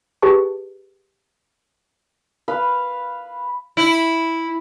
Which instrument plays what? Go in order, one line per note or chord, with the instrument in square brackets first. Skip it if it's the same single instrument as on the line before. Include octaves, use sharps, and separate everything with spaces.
[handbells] G4 G#4 B4 A5 C#6
[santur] B4 F5
[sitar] E4